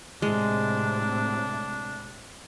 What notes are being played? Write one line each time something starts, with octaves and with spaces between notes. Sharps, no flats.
A2 C3 G#3 D4